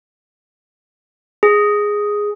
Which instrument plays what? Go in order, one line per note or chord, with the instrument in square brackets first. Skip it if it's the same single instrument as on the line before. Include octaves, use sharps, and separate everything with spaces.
[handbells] G#4